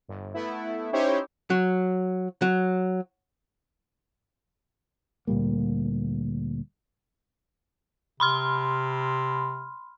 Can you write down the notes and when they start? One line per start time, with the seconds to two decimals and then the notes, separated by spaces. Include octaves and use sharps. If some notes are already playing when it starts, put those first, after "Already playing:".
0.09 G1
0.34 A3 B3 E4
0.93 C#4 D#4 E4 G4 C5 C#5
1.50 F#3
2.42 F#3
5.27 D2 A#2 G3 A#3
8.20 C3 B5 C6 F6